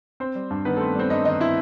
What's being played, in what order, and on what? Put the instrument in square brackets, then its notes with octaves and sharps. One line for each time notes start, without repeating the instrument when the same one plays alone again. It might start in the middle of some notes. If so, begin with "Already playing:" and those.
[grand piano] C4 C5
G3
G2
D#3 B3 B4
A3 C4 A4
G3 C4 C5
G2 D#4 D#5
D#3 D#4 D#5
C4 E4 E5